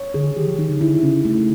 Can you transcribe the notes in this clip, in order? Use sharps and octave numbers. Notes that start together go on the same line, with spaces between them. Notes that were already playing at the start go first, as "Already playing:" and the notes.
Already playing: C#5
D3 G#4
D#3 G4
F3
D#3 D#4
D3
D3 E4
C#3 C#4
A3